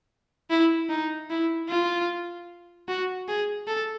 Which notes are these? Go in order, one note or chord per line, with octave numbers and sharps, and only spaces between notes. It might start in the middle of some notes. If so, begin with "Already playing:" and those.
E4
D#4
E4
F4
F#4
G#4
A4